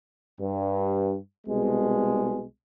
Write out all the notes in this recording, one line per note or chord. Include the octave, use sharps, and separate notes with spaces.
G2
C2 B2 G#3